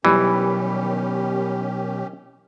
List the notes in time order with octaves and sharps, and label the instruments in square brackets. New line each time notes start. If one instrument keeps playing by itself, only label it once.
[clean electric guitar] B2 F#3 B3 [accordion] D#3 C#4 G4 [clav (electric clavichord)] E3 [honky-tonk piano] G3